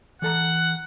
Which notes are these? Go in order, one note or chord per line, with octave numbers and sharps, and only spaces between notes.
E3 A4 F#5 A#5